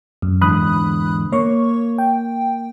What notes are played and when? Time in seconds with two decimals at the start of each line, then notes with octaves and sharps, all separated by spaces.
0.22 F#2
0.42 E2 G#2 D3 B5 D#6 F#6
1.32 A#3 C#5 C#6
1.98 G5